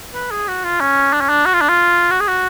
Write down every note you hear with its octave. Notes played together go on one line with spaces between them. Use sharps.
B4
G#4
F#4
F4
C#4
D4
C#4
D4
F#4
F4
D4
F4
F#4
G#4
F#4